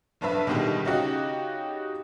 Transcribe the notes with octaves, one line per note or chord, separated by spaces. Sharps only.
F1 G2 D4 B4 E5
B2 D3 D#3 G3 G#3
C#3 D#4 F#4 G4